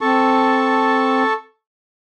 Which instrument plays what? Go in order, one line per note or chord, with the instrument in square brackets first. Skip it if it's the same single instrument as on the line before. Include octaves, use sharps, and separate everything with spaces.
[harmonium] C4 [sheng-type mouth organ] A4 A5 C#6